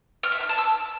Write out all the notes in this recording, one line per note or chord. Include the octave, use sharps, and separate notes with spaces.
F6
E5
F6
A5
E6